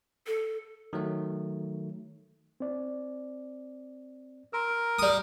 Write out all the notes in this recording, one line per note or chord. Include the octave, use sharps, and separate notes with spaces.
A4
D#3 F#3 A3
C4 D5
A#4 C6 E6
G3 D#6